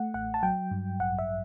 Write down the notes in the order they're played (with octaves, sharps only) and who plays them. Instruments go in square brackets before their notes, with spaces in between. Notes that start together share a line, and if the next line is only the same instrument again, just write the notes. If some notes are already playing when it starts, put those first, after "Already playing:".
Already playing: [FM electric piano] A3 F#5
A1 F#5
A5
F#3 G5
G2
A1 F#5
E5